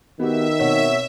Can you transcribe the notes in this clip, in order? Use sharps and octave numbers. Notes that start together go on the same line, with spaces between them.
D#3 B3 F#4 G4 E5
B2 C4 C#5 F#5